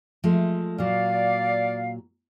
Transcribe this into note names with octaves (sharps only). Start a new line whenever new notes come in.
F3 G#3 A3
A#2 F#3 D5 F5